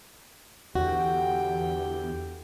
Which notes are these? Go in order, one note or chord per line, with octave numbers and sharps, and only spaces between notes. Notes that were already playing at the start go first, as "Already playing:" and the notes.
E2 D3 F#4 G4 G5